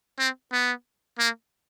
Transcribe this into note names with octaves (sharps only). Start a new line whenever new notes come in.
C4
B3
A#3